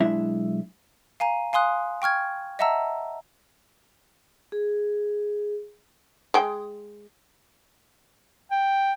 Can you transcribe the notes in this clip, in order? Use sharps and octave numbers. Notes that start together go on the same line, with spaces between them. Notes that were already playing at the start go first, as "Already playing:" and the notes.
B1 G#3 D4 E4 E5
F5 G#5 A#5 D#7
F5 G#5 C6 D#6 F#6
G5 C#6 F6 G#6
D#5 E5 F#5 A5 A#5 E6
G#4
G#3 G5
G5